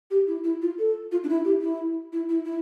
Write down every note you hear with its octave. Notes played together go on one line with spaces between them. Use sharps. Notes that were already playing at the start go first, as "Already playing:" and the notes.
G4
E4
E4
F4
A4
F4
D4
E4
G4
E4
E4
E4
E4